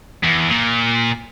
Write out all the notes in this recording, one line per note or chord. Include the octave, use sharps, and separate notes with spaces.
E2
A#2